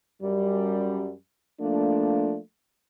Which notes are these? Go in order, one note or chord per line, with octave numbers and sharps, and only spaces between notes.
F#2 G3
F3 A3 A#3 D4